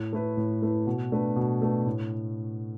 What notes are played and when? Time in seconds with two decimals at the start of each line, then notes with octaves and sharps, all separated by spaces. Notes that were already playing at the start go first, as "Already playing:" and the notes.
Already playing: A2
0.13 A3 E4 B4
0.37 A2
0.62 A3 E4 B4
0.87 B2
1.12 A3 D4 B4
1.36 B2
1.62 A3 D4 B4
1.86 A2